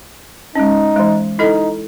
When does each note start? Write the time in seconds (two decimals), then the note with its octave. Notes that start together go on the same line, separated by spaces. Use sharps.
0.56 G#3 C#4 D#4
0.96 E3 G#3
1.39 D#4 E4 A4 D#5